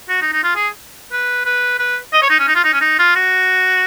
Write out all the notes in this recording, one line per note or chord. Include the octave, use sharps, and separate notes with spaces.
F#4
D#4
D#4
F4
G#4
B4
B4
B4
D#5
C#5
D#4
C#4
D#4
F4
D#4
C#4
D#4
F4
F#4